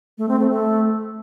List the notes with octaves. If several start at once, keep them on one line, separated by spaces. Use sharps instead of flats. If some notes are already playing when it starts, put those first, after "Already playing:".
A3
C4
A3
A3